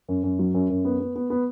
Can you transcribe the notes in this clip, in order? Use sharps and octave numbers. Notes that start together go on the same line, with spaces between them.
F#2
F#2
F#3
F#2
F#2
B3
B3
B3
B3